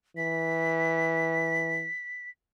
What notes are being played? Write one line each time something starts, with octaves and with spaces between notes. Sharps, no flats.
E3 B6